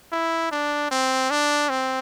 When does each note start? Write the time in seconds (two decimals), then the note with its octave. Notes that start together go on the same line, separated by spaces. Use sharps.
0.12 E4
0.52 D4
0.91 C4
1.30 D4
1.69 C4